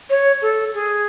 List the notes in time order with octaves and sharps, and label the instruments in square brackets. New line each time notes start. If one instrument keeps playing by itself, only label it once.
[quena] C#5
A4
G#4